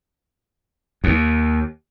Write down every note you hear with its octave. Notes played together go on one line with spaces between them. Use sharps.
D#2